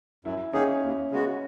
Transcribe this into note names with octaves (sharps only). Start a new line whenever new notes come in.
F#2 E4
D#3 A#3 C#4 D#4 G#4
D#2
C#3 G#3 B3 F#4